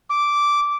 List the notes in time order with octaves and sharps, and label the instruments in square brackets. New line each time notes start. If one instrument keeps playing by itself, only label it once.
[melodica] D6